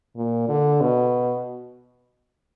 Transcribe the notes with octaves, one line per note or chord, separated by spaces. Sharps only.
A#2
D3
B2